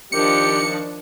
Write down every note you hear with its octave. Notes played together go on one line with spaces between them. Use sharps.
D#3 F3 D4 G4 C#7